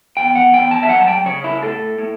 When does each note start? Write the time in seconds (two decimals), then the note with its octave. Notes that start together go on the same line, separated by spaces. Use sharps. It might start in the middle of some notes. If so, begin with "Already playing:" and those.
0.17 E2 G5
0.35 F#5
0.53 E2 G5
0.71 A5
0.83 E5
0.89 F#3 F#5
1.01 A5
1.08 G5
1.25 C#3 C#5
1.44 E4
1.62 A2 A4
1.98 A2